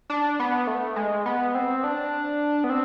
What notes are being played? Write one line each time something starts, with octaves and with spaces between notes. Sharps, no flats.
D4
B3
A3
G#3
B3
C4
D4
B3
C4